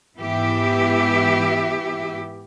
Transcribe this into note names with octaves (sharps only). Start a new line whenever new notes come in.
G#2 E3 B3 G4 E5